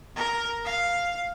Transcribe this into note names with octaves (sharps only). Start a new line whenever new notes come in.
A#4
F5